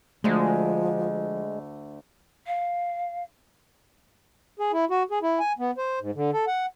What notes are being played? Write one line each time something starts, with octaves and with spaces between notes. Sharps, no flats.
D2 D3 F3 G#3 A3
F5
G#4
E4
F#4
G#4
E4
G#5
B3
C5
G#2
D3
A4
F#5